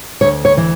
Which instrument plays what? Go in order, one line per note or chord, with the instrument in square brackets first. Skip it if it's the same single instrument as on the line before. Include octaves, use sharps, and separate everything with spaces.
[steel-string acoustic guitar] D2 C#5
C#5
E3